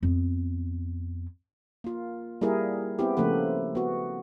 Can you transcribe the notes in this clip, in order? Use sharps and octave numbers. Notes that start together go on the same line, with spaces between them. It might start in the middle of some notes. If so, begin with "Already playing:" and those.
F2 B3
A#3 F4
G3 A#3 E4 G#4 A#4
B3 C4 E4 G4
C#3 F3 A3 A#3 B4
B3 F#4